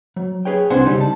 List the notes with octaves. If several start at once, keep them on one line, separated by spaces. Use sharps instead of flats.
F#3
G#4 B4 C#5 G5
C2 C4 D4 C5 F#5 G#5
C#3 G3 D#4
A5